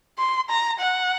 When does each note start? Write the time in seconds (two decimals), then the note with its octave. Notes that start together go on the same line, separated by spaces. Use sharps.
0.19 C6
0.49 A#5
0.80 F#5